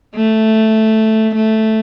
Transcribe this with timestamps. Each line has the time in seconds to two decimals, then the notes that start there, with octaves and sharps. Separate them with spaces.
0.16 A3
1.35 A3